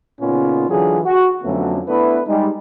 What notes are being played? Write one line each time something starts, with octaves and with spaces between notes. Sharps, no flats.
A#2 C#3 B3 C#4 D#4 F4
D3 E3 F#3 D4 F4 G#4
F#4
F2 D3 F#3 A3 B3 C#4
A3 B3 D4 E4 B4
G3 G#3 D#4